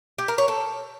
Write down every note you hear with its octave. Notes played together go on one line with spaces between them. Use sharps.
G4
A#4
C#5
A4